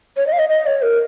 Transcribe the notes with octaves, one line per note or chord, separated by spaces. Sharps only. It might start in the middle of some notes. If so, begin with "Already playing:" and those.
C#5
D#5
F5
D#5
D#5
C#5
A#4